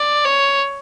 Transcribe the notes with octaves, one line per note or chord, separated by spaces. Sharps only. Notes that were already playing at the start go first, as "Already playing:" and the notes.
Already playing: D5
C#5